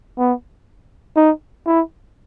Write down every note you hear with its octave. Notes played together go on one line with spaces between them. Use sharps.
B3
D#4
E4